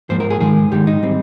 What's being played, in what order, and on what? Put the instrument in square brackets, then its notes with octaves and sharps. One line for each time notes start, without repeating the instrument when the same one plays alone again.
[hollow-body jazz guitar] G#2 F3 A#3 C5
A#4
G#4
G#2 D#3 G#3 G#4
G#2 D#3 G#3 G4
D#4
G3 C4